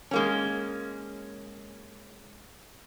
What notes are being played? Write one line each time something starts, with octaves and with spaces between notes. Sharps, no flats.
G#3 A#3 C#4